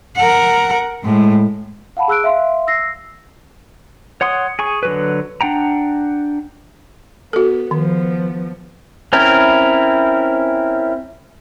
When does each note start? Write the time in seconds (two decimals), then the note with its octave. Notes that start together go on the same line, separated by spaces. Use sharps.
0.16 A#4 F#5
1.04 A2 G#3
1.97 F5 F#5 A5 B5
2.08 G#4 E6 F#6 D7
2.24 E5 F5 C6
2.67 E6 A#6 C7
4.21 C#5 F#5 C6 D#6
4.59 G#4 G#5 C#6
4.83 D3 F#3 B4
5.41 D4 F#5 G5 A#5
7.33 B3 F#4 A4
7.71 D#3 F3 B3
9.13 C4 C#4 E4 A#4